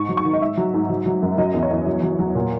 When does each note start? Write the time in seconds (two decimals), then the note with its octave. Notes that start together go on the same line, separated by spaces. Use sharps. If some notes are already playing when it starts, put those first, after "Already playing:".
Already playing: G#2 C#6
0.09 F#3
0.17 C#6
0.25 D#3
0.33 D#5
0.41 G#2 E5
0.57 F#3
0.74 G#2
0.90 F#3
1.06 F#3
1.22 F#2
1.38 F#3 D#5
1.54 E2
1.63 C#5
1.71 E2
1.87 F#3
2.03 F#3
2.19 F#3
2.35 A#2